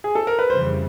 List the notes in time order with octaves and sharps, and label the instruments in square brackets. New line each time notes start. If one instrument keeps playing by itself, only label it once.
[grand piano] G#4
A4
A#4
B4
[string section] F2 C#3 E3 G3 [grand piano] C5